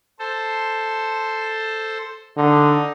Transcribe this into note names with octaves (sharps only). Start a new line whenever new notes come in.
A4 C5
D3 D#4